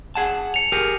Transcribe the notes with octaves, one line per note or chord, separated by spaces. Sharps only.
G#4 F#5 A5
C#7 F7
G4 G#4 A#4